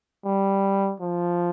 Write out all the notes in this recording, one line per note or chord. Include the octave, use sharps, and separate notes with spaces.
G3
F3